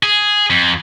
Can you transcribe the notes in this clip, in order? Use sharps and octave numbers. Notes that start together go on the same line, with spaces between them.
G#4
F2